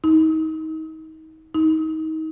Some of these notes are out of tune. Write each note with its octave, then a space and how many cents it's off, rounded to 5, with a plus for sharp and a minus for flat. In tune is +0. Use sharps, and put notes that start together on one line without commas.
D#4 +30
D#4 +25